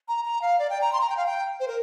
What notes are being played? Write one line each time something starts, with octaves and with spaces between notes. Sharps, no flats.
A#5
A#5
F5
D5
G5
A#5
C6
A#5
G5
F5
G5
C5
A#4